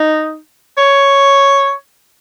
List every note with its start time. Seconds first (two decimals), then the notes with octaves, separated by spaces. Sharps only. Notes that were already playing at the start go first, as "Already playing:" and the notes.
Already playing: D#4
0.78 C#5